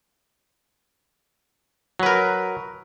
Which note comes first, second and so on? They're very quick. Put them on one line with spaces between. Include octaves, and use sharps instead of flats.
F#3 B4 A#4